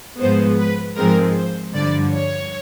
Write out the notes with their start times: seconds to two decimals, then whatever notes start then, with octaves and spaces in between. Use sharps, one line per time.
0.20 G#2 F3 G#3 B3 C5
0.59 B4
0.97 G#2 F3 G#3 C4 A#4
1.37 C5
1.75 G2 D3 F3 D5
2.14 C#5